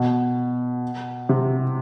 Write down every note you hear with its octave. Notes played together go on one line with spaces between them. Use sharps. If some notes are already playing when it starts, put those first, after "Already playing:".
Already playing: B2
C3